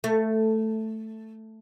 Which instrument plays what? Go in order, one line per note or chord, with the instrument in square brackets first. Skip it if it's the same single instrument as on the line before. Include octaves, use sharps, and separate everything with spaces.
[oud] A3